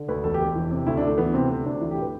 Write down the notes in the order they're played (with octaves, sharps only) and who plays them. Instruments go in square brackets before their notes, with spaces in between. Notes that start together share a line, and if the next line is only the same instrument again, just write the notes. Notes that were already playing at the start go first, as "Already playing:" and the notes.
Already playing: [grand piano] D3
D2 B4
E1 A4
G4
E1
E3
C3
D2 E4
D4
D2 A3
E3 B3
C3 C4
D2 C4
D2 D4
E3 E4
G4
A2 B4